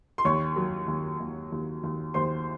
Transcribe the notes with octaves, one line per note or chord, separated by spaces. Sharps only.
C6
D#2 C#5 C#6
F#3
D#2
D#2
D#2
D#2
D#2 C5 C6